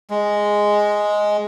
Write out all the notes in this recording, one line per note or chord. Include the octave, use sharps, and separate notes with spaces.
G#3